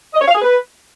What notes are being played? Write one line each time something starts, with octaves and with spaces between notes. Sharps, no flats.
D#5
C#5
F5
G#4
B4